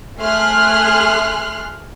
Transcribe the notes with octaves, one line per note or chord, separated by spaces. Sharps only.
A3 G#4 C6 F6 F#6